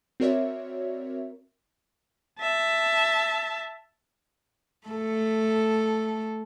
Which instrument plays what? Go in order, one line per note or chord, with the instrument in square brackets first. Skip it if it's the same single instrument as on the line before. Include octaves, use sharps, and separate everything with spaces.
[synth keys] C4 F#4 A#4 C#5 D5 E5
[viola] E5 A5
[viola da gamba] A3 A4